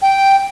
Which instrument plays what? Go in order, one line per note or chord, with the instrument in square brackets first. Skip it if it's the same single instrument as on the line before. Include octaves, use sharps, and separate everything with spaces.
[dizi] G5